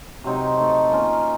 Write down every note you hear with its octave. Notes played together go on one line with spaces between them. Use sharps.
C3 F#3 C4 D#4
A3 D#4 A4
A#3 C#4 F4 A#4